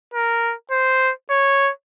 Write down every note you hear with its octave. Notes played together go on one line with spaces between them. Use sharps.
A#4
C5
C#5